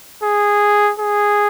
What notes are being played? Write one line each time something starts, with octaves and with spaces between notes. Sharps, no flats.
G#4
G#4